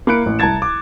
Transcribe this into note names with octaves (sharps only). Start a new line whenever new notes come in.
A#3 E4 B5 F#6 C#7 D7
A1
C2 A5 A#5 G#6 A6 E7
D6